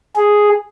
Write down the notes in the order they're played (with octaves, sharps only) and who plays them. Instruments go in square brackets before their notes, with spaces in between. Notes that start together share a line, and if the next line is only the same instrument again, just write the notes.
[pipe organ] G#4